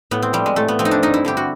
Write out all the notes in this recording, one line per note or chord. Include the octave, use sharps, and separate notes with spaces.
A2 B3
C4
F3 G3
G#3
A2 A3
B3
F3 C4
D#4
D4
G2 D#4
E4
D3 G3 G4
F#4